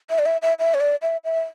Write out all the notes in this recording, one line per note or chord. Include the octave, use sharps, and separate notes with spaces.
E5
D5
E5
E5
E5
C#5
D5
E5
E5